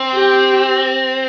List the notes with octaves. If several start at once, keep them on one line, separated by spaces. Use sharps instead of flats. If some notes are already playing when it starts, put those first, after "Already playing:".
Already playing: C4
G4